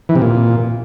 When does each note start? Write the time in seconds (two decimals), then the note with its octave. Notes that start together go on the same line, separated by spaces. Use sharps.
0.09 E3
0.15 C3
0.22 A#2